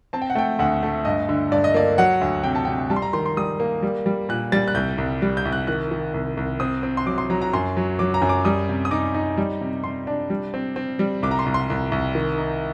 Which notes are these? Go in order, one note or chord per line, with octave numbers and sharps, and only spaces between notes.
C4 A5
G5
F#5
A3 G5
D2 F#5
A3
G2 D#5
D3
G2 D5
D#5
A#3 D5
F#3 F#5
D2
C3 G5
A5
C3 G5
G3 A5
C6
A#5
D#3 C6
C6
G3 D#6
A#3
G3
G3
A#2 F#6
G3 A6
F#6
C2 G6
C2
G3
G6
C2
F#6
D#3 F#6
D#3
C2
C2
C4 D#6
C4
C6
F#3 D6
C6
F#3 A#5
A#5
F#2 C6
F#3
F#3 D6
A#5
F#2
D6
G3 D#6
C3
D#6
D#4 D6
D#4
G3
C3
C3 C6
D4
G3
C4
C4
G3
C2 D6
A#5
C6
C2
C6
C2
C2
D#3
D#4